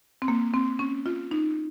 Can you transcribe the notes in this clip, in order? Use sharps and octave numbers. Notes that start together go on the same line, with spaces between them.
C4
A#3
C4
C#4
F4
D#4